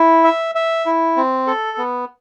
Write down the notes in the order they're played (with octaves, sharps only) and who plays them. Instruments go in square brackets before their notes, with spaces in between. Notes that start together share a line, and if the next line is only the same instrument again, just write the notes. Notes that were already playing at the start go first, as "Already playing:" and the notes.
Already playing: [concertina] E4
E5
E5
E4
C4
A4
B3